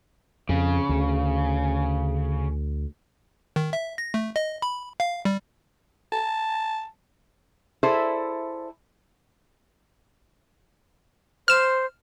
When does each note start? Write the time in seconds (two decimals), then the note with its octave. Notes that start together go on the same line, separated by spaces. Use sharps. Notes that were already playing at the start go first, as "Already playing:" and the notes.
0.49 F2 C#3
0.89 D2
3.56 D#3
3.73 E5
3.98 A#6
4.14 A3
4.36 D#5
4.62 B5
5.00 F5
5.25 G3
6.12 A5
7.83 E4 G#4 A4 C5 D5 E5
11.48 C5 F6 E7